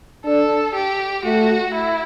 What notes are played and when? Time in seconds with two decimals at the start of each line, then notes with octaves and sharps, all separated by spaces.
0.26 D4 A4
0.75 G4
1.25 A3 F#4
1.75 E4